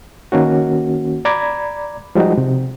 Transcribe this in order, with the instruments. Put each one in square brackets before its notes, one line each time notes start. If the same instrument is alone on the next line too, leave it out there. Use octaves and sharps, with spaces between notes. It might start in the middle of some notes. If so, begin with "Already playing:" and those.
[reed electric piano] D#3 A#3 C#4 F#4
D5 A#5 B5 D6 G#6
F3 G3 G#3 D#4 F#4
C3